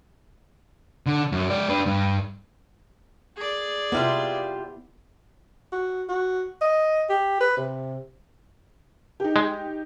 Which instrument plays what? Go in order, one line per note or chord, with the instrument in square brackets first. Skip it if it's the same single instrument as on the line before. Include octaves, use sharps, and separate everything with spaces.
[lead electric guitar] D3
F#2
G#3 D5
D4 B4
G2
[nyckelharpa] G#4 D5
[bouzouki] C3 G3 F4 [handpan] B3 E4
[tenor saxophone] F#4
F#4
D#5
G4
B4
C3
[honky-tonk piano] D#4 G4
[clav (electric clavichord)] G#3